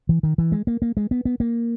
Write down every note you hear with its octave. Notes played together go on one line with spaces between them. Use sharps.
E3
D#3
E3
G#3
A#3
A#3
G#3
B3
B3
A#3